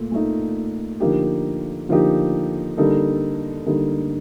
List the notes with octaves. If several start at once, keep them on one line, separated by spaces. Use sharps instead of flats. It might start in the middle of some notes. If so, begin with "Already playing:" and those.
Already playing: A#2 A3
A#2 A3 D#4
D3 F3 A#3 D#4 G4
D3 F3 A#3 D#4 G4
D3 G3 A#3 D#4 A4
D3 G3 A#3 D#4 A4